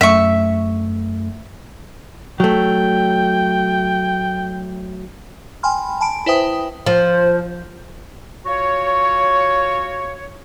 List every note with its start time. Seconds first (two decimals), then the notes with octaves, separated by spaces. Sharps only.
0.01 F#2 A3 E5 C#6
2.40 F#3 A3 G5
5.63 G5 G#5 B5 C6 F6
6.01 G#5 A5 B5 D7
6.26 E4 B4 C5 E5 G5 D#6
6.86 F3 C5
8.46 F4 F#4 C#5